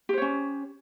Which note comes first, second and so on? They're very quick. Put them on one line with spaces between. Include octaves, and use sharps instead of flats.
G4 C5 C#5 C#4